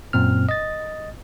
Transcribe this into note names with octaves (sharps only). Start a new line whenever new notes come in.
F#2 A#2 C4 F6
D#5 A6